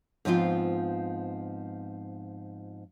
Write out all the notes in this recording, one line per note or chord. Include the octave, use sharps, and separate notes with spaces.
G#2 F3 B3 C4 E4 F4